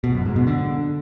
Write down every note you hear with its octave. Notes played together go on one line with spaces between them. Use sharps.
B2
F#2
G#2
B2
D3